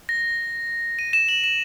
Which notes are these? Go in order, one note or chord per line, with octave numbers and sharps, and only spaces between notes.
A#6
D#7
E7
F#7
E7